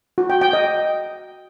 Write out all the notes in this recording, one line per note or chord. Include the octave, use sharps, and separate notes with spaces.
F#4
G5
G5
D#5